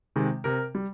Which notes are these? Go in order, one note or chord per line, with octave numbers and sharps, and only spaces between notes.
C3 D#3 G#3
C3 A#4
G3